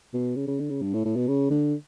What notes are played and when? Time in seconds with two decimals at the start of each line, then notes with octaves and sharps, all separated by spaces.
0.14 B2
0.36 C#3
0.47 C#3
0.59 D3
0.70 C#3
0.82 G2
0.94 A2
1.05 A2
1.16 B2
1.28 C#3
1.50 D3